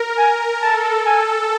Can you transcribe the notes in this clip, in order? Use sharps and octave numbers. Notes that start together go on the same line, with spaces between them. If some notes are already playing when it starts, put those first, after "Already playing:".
Already playing: A#4
G#5
A4 A5
A4 G#5